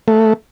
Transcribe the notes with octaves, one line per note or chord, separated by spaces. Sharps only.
A3